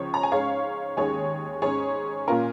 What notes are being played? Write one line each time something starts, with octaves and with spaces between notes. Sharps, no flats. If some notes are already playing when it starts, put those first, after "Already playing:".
Already playing: C#2 C#3 F3 C#5
A#5
G#5
G#2 G#3 C#4 C#5 F5
D#2 D#3 G#3 C#4 G#4 C#5
G#2 G#3 C#4 G#4 C#5
A#2 A#3 C#4 F4 A#4